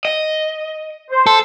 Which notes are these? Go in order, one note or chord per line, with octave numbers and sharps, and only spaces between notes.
D#5
C5
A4